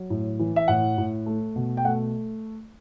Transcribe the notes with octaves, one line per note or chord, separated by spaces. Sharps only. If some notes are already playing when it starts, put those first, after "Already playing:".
Already playing: F#3
A2
E3
E5
A2 F#5
A2
A3
B2
G5
A3 F#5